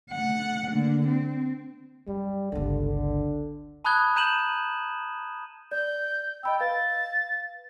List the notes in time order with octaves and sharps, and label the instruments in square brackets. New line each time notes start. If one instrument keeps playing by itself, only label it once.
[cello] A3 F#5
D3 A#3
C4
[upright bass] F#2 [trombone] G3
[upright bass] G1 C#2 [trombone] D3
[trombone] D3
[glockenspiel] A5 B5 D#6 F#6 G#6 G7
A#5 G6 D#7 E7 F#7
[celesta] D5 [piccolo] G6
[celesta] D#5 B5 E6 [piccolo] G5
[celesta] B4 F5 [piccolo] A6